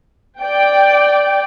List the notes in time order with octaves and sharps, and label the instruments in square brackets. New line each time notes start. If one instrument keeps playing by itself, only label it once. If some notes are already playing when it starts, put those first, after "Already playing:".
[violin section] D5 G5